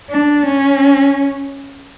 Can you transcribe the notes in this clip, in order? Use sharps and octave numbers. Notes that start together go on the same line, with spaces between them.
D4
C#4